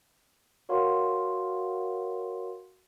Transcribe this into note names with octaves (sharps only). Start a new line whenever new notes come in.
F#4 A#4 C#5 F5 F#5 C6